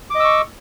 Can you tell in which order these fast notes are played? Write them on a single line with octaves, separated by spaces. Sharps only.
D6 D#5 E6 C#6